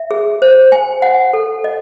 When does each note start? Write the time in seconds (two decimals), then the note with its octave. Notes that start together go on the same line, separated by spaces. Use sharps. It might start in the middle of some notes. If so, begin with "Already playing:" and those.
Already playing: E5
0.11 G#4
0.42 C5
0.72 G#5
1.02 F#5
1.33 A4
1.64 D#5